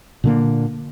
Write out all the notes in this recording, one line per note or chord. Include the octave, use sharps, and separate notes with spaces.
A#2 D3 A#3